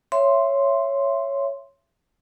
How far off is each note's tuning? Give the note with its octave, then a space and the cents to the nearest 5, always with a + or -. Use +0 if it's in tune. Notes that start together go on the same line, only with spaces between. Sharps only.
C#5 +0 E5 +25 C6 +0